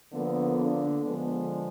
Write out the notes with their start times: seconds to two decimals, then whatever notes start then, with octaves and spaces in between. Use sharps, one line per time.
0.11 D3 F3 A#3 B3
0.57 D3 D4
1.02 D3 F3 G#3 B3